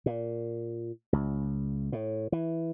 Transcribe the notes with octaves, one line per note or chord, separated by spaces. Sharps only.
A#2
C#2
A2
E3